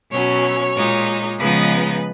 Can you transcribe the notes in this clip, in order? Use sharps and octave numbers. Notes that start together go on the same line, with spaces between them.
B2 F#3 C#4 C#5
A#2 G#3 D#4
C#3 F3 G#3 B3 D#4 B4